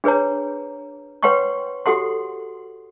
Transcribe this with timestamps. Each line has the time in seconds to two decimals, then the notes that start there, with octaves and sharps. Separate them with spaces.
0.04 D4 G#4 B4 C#5 A#5
1.23 B4 C#5 F#5 G5 C6 C#6
1.86 F#4 G4 A4 F#5 C6